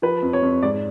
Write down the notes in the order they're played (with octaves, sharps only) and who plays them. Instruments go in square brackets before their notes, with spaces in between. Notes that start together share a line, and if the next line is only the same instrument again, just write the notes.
[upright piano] F3 B4
F2
C#5
F2
G#2 D5